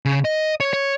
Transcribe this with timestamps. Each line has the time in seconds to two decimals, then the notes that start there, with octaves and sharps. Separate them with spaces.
0.05 C#3
0.25 D#5
0.60 C#5
0.73 C#5